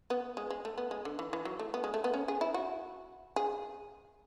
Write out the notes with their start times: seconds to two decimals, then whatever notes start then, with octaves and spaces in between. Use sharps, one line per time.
0.10 B3
0.37 G#3
0.50 G#3
0.65 A3
0.78 B3
0.91 G#3
1.05 D3
1.19 E3
1.33 E3
1.45 F#3
1.59 A3
1.74 B3
1.84 G#3
1.94 A3
2.04 B3
2.14 C#4
2.28 G#4
2.41 E4
2.54 F#4
3.36 G#4